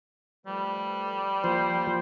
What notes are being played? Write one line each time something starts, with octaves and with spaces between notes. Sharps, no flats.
F3 G3 A3 B4
F3 A#3 C5 G5